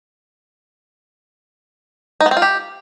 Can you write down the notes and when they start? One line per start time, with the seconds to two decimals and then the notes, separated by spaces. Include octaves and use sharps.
2.20 D#4
2.26 B3
2.31 C4
2.37 F4
2.42 G4